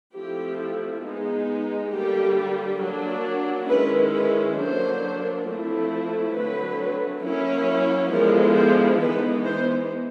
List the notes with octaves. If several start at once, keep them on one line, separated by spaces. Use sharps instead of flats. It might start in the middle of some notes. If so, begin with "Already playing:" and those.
F3 A3 C4 E4 G4
G#3 B3 D#4
D3 G3 A#3 G4
F#3 A#3 D4
D#3 G#3 C#4 E4 B4
B4
D3 F#3 A#3 D4 C5
F3 A3 C4 E4
D3 F#3 A3 C4 B4
F#3 A#3 C#4 E4
D3 F3 G#3 B3 E4 A#4
C5
E3 G#3 B3 D#4 B4
C5